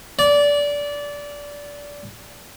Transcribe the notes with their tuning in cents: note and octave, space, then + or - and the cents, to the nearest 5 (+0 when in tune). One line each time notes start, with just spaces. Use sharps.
D5 -20